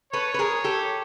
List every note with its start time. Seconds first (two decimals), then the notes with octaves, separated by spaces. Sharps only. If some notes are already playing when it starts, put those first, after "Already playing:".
0.13 A4 B4 C#5
0.34 B4
0.39 G#4 A#4
0.64 G4 A4